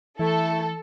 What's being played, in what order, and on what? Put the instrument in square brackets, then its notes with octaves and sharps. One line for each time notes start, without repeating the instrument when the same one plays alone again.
[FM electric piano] E3 [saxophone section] A3 E4 [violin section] A4